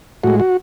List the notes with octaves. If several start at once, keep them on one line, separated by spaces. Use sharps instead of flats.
A2 G#3 F#4
F#4